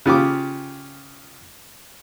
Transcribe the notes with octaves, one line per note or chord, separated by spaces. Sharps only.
C#3 F4 G4 D6